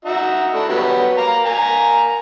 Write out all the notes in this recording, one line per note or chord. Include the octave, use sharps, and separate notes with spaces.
D#4 F#4 E5
A3 D4 E4
F#3 G3 B3
A#3 A#5
A#3 G#5 A#5